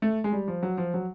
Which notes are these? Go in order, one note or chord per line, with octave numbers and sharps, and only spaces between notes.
A3
G#3
G3
F3
F#3
F3
F#3